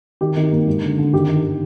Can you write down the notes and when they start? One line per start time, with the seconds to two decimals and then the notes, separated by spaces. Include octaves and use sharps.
0.21 D#3 G4
0.37 D#3
0.52 A#3
0.67 G#3
0.82 D3
0.98 D3
1.13 D#3 G4
1.28 D#3
1.44 D#3